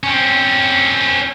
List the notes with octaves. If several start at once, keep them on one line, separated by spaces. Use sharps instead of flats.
C4 C#4